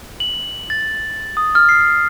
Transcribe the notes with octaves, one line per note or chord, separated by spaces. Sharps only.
F#7
A6
D#6
F6
C7